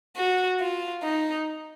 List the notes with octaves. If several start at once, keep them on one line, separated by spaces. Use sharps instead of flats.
F#4
F4
D#4